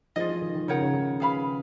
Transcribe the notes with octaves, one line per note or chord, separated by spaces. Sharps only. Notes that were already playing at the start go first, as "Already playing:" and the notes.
F3 F4 G#4 D#5
F3
D#3
D#3
C#3 D#4 A#4 C#5 F#5
C#3
D#3
G#4 B4 F5 B5